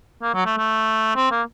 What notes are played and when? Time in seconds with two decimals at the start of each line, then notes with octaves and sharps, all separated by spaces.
0.23 A#3
0.34 F#3
0.46 A3
0.57 A3
1.16 C4
1.32 A#3